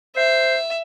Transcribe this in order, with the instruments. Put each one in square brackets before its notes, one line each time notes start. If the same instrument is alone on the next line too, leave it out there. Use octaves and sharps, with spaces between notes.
[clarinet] C5 [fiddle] E5